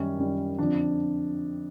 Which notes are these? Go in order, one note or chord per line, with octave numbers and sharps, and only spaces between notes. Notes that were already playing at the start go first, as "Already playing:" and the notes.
Already playing: F#2 D#3 G3 C#4
F#2 D#3 G3
F2 D3 F3 D4